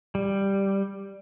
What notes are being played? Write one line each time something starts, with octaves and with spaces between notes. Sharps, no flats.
G3